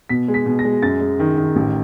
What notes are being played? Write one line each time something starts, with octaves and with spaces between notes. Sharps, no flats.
B2 B6
G#3
B6
B2
A#6
G#3
F#2 A6
G#3
D#3
D#3
A1